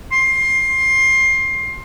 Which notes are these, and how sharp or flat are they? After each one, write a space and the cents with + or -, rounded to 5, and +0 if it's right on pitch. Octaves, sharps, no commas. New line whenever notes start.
C6 +20